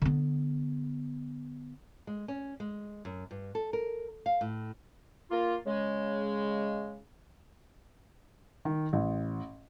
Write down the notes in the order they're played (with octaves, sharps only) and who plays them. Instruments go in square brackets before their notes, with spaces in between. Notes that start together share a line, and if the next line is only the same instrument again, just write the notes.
[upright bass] D3 B3
[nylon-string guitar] G#3
C#4
G#3
F#2
G2
A4
A#4
F5
A2
[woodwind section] A#3 F4
C#3 G#3
[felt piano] D#3
A1